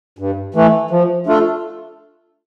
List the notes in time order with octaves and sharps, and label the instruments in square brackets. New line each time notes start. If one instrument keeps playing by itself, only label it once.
[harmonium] G2
E3 A3
F3
A3 D4 F4 A4